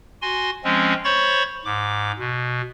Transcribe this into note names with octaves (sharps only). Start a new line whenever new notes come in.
F#4 G#5 C6
F3 G#3 C4 C#4
C5 C#5 B5 C#6 A6
G#2 D6
B2